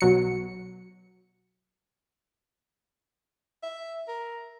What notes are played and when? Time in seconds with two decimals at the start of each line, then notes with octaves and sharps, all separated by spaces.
0.01 B1 F#3 C#7
3.63 E5
4.08 A#4